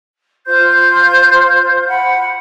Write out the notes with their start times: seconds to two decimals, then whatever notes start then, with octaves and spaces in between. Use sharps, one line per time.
0.47 F4 C5 C6 G6
1.88 F#5 B5